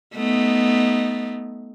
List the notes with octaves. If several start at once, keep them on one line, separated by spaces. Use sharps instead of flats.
A3 B3 D#4